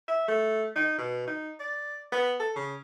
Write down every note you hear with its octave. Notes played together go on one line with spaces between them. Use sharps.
E5
A3
D#4
B2
D#4
D5
B3
A4
C#3